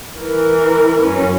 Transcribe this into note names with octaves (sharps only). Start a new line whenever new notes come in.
E3 A#4
F#2 C#4